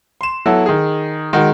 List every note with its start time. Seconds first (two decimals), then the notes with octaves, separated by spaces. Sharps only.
0.21 C6 E7
0.46 F#3 B3 E4 A4
0.66 D#3 G#4
1.33 D#3 G#3 F#4